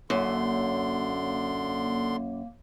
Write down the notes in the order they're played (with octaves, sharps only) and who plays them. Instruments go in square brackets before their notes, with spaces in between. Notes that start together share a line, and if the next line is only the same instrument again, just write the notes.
[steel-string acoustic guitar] F#2 [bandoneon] D3 C6 [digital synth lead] A#3